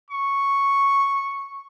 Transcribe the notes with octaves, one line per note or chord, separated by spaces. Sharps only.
C#6